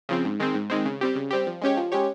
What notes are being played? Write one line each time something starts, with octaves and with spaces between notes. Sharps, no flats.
C#3 F3 C4
G#2
D#3 G#3 C4
G#2
D#3 G#3 C4
C#3
G3 C4 G4
C#3
G3 C4 G4
F3
G#3 C#4 G4 C#5
F3
G#3 C#4 G4 C#5